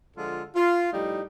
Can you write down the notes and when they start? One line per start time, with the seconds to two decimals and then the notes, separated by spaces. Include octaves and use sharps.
0.17 D3 F3 G#3 F4 A4
0.55 F4
0.92 A2 F3 G3 D#4